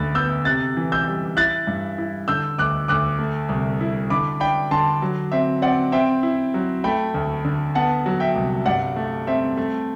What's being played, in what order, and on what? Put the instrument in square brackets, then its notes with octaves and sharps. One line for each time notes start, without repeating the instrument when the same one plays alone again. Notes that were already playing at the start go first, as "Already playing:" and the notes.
Already playing: [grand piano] D2 D3 B5 F#6 A6
B3 E6 G6
C3 F#6 A6
E3
E6 G6
G3
E4 F#6 A6
G2
E4
D3 E6 G6
D2 D6 F#6
D2 D6 F#6
A3
C2
E4
D3 B5 D6
D4 G5 B5
D3 A5 C6
F#3
C4 E5
C4 D5 F#5
C4 E5 G5
E4
F#3
A3 G5 B5
D2
D3
B3 F#5 A5
F#3
E5 G5
C2
G2 D5 F#5
A3
C4 E5
A3